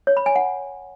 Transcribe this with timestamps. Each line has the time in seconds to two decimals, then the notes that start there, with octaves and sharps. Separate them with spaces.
0.07 C#5
0.17 B5
0.26 G#5
0.36 F#5